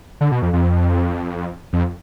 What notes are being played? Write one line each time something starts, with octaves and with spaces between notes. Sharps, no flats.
D3
B2
F2
F2
F2